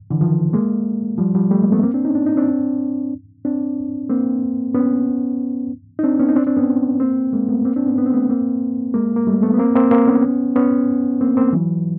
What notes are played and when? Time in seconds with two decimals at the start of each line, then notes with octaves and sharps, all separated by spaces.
0.10 D3 E3
0.21 D#3 F3
0.53 G#3 A#3
1.18 F3 G3
1.34 F3 G3
1.51 G3 A3
1.62 G#3 A#3
1.72 A3 B3
1.83 A#3 C4
1.94 C4 D4
2.05 C#4 D#4
2.15 D4
2.26 D#4
2.37 C4 D4
3.45 C4 D4
4.10 A#3 C4
4.74 B3 C#4
5.99 D#4
6.04 C4 D4
6.19 B3 C#4
6.28 D#4
6.36 C4 D4
6.47 C4 D4
6.57 B3 C#4
7.00 A#3 C4
7.33 G#3 A#3
7.49 A3 B3
7.65 A#3 C4
7.76 C4 D4
7.86 B3 C#4
7.98 B3
8.06 C4
8.14 A3 B3
8.30 A#3 C4
8.94 G#3 A#3
9.16 A#3
9.27 G3 A3
9.43 A3 B3
9.54 B3
9.59 A#3 C4
9.75 A#3 C4
9.91 A#3 C4
10.07 B3 C#4
10.56 B3 C#4
11.21 A#3 C4
11.37 A#3 C4
11.53 E3 F#3